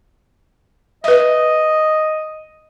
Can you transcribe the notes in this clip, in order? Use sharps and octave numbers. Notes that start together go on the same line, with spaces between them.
B4 D#5 E5